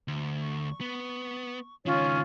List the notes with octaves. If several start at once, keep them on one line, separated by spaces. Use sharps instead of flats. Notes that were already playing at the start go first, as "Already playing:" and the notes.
D2
C#6
B3
C#2 D#3 C#4 F4 C#5